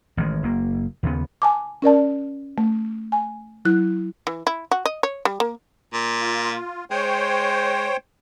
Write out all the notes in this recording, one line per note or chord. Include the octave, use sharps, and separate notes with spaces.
A1 D#3 G#3
F#1 A#3
D#2 C#3 B3
G#5 A5 D6
C#4 A#4 D5 A5
A3
G#5
F#3 E4 F#6
E3
E4
F#4
D#5
C#5
G3
A#3
A#2
F4
G#3 C5 C#5 G5